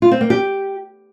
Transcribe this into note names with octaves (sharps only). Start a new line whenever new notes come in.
F4
C4
A#3
G4